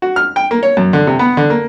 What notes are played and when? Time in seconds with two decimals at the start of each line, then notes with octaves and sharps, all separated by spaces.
0.02 F#4
0.16 F6
0.36 G5
0.51 A#3
0.63 C#5
0.77 F#2
0.93 D3
1.07 C3
1.19 B3
1.37 D3
1.50 A#3